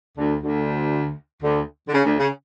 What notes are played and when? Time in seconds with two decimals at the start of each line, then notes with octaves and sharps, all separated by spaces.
0.17 D2 D3
0.43 D2 D3
1.43 D2 D3
1.88 D3
1.94 C#3
2.05 D2 D3
2.18 C#3